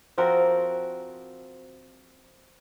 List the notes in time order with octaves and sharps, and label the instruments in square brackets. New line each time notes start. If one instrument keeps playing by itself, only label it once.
[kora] F3 C4 F#4 A#4